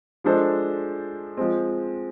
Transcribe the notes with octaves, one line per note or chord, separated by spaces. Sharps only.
F3 G#3 D4 A4 C5
F3 G#3 C4